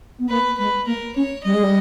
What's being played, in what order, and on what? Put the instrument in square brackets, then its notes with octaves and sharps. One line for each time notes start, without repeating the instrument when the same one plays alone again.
[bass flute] B3
[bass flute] A#3 [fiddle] B4
[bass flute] G#3 [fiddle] B4
[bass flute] A#3 [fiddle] A#4
[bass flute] C#4 [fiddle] C#5
[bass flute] G3 [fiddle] D#5
[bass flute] G#3
G3